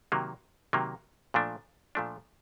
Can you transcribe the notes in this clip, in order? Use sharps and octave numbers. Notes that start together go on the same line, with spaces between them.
C3 D#3 F#3 A#3
C3 D#3 F#3 A#3
A#2 F3 A3 D4
A#2 F3 A3 D4